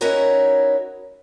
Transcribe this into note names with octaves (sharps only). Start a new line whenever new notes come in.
C#4 D#4 E4 F#4 A#4 C#5